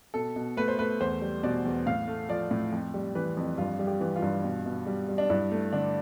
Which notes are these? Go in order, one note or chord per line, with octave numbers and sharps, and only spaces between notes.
B2 A4
B2
A3 B4
C5
A3 B4
E2 C5
G3
B2 D5
E2
A2 F5
A3
F3 D5
A2
F2
G3
E3 B4
F2
G2 F4
G3
G4
E3
F4
G2
B2
B2
G3
G3
D4
G2 E4
A3
D3 D4